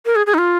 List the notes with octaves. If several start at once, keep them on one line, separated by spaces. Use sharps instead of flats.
A#4
G#4
G#4
D#4
F4